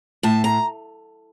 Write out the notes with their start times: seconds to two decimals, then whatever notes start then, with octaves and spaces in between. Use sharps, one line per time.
0.23 A2 A5
0.44 A#5